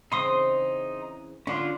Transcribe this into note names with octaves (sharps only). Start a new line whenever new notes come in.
C#3 E3 C4 D#4 C6 D#6
D3 C#4 D4 F4